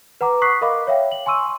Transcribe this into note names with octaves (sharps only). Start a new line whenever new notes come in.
B4 F#5 A#5 D6
C#6 D#6 F#6 B6 C7
A#4 D#5 F5 B5 D6
C#5 E5 F5 G5
F#7
G#5 C6 C#6 E6 D#7